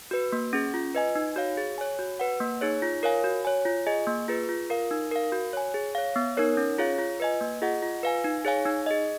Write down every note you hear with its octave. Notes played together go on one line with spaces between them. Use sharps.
F#4 B4
A#3
C#4 G#4
F4
B4 D#5 G#5
D#4
F#4 C#5 F5
G#4
C#5 G#5
F#4
B4 F#5
A#3
D#4 G#4 C#5
F4
A#4 C#5 F5 G#5
F#4
C#5 G#5
F4
G#4 D#5 G#5
A#3
F4 G#4 B4
F4
A#4 F5
D#4
A#4 F5
F#4
C#5 G#5
G#4
C#5 F5
B3
D#4 A#4 C#5
C#4
F4 G#4 C#5 F5
F4
B4 D#5 G#5
A#3
F4 G#4 D#5 F#5
F4
B4 F5 G#5
D#4
G#4 C#5 F5 G#5
D#4
G#4 D#5